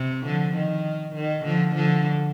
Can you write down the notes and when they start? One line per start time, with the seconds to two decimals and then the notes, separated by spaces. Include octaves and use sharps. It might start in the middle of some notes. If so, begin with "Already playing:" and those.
Already playing: C3
0.25 D3 F3
0.55 D#3
1.15 D#3
1.45 D3 F3
1.75 D3 F3